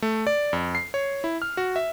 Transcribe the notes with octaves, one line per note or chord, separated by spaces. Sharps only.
A3
D5
F2
C7
C#5
E4
F6
F#4
E5